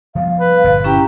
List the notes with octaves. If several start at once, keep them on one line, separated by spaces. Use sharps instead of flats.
F3 G3 B3 F5
B4
G1 A#2
C#4 E4 G4 A#5